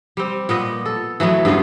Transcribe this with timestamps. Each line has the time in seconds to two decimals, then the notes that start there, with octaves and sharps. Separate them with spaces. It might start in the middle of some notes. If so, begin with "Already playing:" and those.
0.17 G3 C4
0.49 A#2 B3 D#5
0.86 A4
1.20 E3 F#3 A3 B3
1.45 G2 C#3 B3 F4